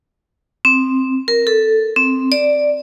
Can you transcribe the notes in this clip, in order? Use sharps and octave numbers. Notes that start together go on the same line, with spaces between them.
C4
A#4
A4
C4
D5